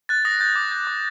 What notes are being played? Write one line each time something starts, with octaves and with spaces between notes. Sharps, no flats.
F#6 A6
D#6 A#6
G6 A6
D6
G6
D6